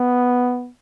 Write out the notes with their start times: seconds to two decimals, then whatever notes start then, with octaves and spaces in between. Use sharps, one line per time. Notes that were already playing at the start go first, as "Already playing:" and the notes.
Already playing: B3